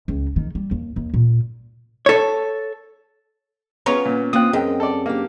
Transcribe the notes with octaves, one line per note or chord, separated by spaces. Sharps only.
C#2
D#3
G3
D#2
D#2
A#2
A4 C#5
B3 C#4 F4 G#4 C#5 A#5
A#2
A#3 C4 F4 G5 D#6 F#6
F#2 C#4 G#4 D#5 G5
A4 D5
A#3 D4 G4